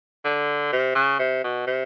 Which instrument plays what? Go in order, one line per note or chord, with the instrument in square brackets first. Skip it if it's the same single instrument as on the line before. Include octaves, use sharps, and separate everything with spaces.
[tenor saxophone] D3
C3
C#3
C3
B2
C3